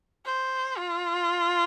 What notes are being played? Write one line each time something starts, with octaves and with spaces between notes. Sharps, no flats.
C5
F4